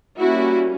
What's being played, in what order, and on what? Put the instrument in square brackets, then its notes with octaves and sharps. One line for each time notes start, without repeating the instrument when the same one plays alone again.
[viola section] G3 A#3 C#4 E4 F#4